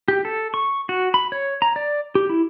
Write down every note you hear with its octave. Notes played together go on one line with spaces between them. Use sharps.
G4
A4
C#6
F#4
B5
C#5
A#5
D5
G4
E4